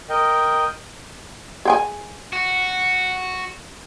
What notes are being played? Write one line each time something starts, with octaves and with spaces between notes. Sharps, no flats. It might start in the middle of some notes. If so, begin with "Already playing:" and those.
A#4 D#5 G5
G#4 G5 G#5
F#4